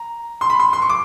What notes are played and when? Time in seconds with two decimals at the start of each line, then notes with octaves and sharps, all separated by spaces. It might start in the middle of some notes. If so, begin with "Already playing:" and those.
Already playing: A#5
0.41 C6
0.50 B5
0.60 C6
0.73 C6
0.82 C#6
0.90 D6